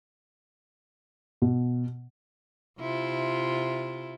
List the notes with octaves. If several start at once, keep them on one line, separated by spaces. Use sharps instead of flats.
B2
C3 E4 F4